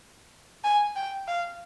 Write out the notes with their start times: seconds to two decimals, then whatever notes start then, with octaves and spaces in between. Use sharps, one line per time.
0.64 G#5
0.96 G5
1.28 F5